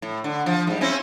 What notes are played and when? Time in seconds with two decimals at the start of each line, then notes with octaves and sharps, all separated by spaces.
0.02 A2
0.24 D3
0.46 F3
0.67 G#2 G3
0.81 C4 C#4 E4